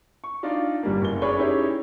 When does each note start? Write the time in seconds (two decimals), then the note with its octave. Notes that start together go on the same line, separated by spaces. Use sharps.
0.24 C#6
0.43 D4 D#4 F4 D5
0.83 G1 G3 A#3
1.02 F#1 G7
1.22 G#4 B4 C#5 D5 C#6
1.37 C#4 D#4 E4 G4 G#4 C#5